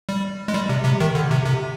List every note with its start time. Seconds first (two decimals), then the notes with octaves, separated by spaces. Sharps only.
0.09 G3
0.48 G#3
0.54 G3
0.69 C3
0.85 C3
1.00 D#3
1.15 D3
1.31 C3
1.45 C3